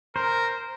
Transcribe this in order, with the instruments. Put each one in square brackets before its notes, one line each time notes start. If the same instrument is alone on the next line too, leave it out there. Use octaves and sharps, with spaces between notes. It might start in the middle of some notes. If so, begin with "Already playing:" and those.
[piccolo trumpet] A#4 [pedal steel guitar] C5